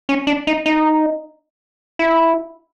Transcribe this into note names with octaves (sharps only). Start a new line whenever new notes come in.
C#4
D4
D#4
D#4
E4